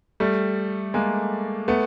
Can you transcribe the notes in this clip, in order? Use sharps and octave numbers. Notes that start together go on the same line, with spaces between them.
G3 A3
G#3 A#3
A3 B3